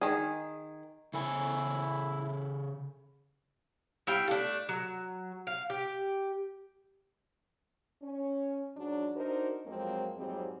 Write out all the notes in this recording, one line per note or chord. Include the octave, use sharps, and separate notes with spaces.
D#3 G#4
C#3 E4 A4 G#5
G3 E4 F5 G5
A3 D4
F#3
F5
G4
C#4
G#2 F#3 D4
D4 D#4 F#4 A#4 C5
F2 F3 F#3 G#3 A#3 C4
F2 G#2 F#3 G3 C4 G#4